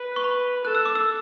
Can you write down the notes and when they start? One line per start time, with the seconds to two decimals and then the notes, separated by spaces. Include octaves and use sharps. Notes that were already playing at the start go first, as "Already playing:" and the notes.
Already playing: B4
0.16 C#6
0.24 B5
0.64 A4 F#6
0.75 E6
0.85 D6
0.95 E6